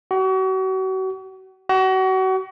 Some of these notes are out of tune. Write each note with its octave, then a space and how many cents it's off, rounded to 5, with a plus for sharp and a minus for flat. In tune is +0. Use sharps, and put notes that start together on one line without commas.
F#4 +35
F#4 +30